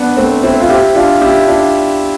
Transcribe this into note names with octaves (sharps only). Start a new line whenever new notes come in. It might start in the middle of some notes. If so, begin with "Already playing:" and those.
Already playing: B3 D4
A3 C4
C4 E4
F4
E4 G4
D4 F4
E4 G4
D4 F4